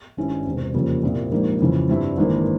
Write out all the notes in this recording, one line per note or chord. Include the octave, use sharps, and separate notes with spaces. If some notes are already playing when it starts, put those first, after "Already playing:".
G#1 G2 G3 C#4 E4
E1 E2 C3
F2 C#3 G3 A#3
C2 A#2 G3 C4
A#1 G#2 G3 A#3
F2 C#3 E3
G2 G3 C4 E4
G#1 G2 E3 A#3